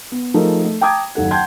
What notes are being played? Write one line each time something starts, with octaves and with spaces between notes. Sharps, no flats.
B3
F3 A3 D#4 G#4 A#4
A3
G5 A5 A#5 D6 D#6 G#6
F#1 D#2 A4 F#5
F#5 G5 A5 C6 G6 G#6